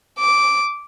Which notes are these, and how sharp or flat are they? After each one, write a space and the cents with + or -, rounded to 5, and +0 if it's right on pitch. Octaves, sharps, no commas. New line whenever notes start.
D6 -10